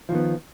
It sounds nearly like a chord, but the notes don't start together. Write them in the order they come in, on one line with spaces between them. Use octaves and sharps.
F3 D#3 B3